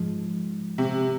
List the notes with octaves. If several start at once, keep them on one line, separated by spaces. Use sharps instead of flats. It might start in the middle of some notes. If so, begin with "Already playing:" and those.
Already playing: G#2 F3 G#3
C3